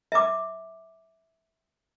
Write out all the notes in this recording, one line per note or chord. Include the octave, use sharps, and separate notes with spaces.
E5 D6